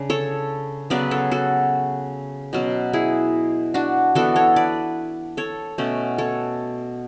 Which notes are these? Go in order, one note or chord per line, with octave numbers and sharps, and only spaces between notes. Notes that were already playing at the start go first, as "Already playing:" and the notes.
Already playing: C#3 D4
A4 C#5
C#3 F#3 B3 B4 D5
A4 C#5
F#4 A4
B2 F#3 C#4
E4 G#4
D4 F#4
E3 B3 D4 F#4 A4
A4 C#5
B4 D5
A4 C#5
B2 A3 C#4
A4 C#5